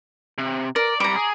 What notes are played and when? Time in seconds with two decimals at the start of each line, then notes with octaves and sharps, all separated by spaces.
0.38 C3
0.76 A#4 D5
1.00 C2 G3 A#5 D6
1.16 G#4